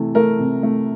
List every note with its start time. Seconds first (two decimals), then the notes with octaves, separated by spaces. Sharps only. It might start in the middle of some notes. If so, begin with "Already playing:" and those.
Already playing: C3 E3 A3
0.15 A3 A#4
0.39 C3
0.63 A3